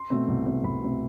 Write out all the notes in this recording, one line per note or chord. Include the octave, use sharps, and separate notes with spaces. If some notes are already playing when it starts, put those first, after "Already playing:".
Already playing: C6
B2 A3 C4
C2
B2 A3 C4
C2 B5
B2 A3 C4